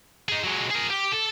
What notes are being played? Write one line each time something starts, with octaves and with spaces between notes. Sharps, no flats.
D#4 G#4
F#3 G#3
G#4 A#4
G4
A4